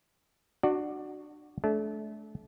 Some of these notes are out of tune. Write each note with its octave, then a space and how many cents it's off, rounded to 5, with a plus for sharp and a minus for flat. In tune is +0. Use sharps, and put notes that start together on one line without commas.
D4 +25 F#4 +0 D5 +15
A3 -35 D4 -30